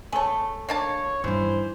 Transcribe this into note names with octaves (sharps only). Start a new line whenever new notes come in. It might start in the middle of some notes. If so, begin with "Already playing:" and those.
A3 G#4 A4 C#5
A#3 D4 C#5 A5
G2 D#3 E3 C5